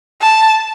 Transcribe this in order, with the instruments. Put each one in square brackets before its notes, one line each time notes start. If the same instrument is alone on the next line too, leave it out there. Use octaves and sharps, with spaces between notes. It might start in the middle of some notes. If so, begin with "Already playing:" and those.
[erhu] A5